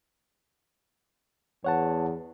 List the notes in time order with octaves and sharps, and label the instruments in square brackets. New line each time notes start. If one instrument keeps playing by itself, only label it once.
[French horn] E2 [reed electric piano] C#5 F#5 A5